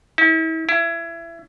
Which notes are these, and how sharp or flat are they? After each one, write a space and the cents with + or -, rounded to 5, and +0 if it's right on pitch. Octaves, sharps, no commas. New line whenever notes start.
E4 -40
E4 +25